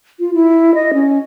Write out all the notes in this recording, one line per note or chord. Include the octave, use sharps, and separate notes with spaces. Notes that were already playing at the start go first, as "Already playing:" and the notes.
F4
E4
D#5
C#4